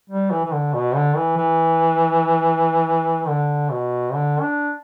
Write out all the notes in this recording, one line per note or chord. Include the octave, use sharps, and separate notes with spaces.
G3
E3
E3
D3
B2
D3
E3
E3
D3
B2
D3
D4